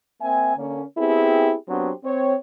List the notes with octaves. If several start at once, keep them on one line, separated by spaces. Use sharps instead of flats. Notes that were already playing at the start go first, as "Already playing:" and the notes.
A#3 C4 E5 G#5
D3 A#3 C#4
B3 C4 E4 G4 G#4
F#3 B3 C4 D4 G4 C5
C4 C#5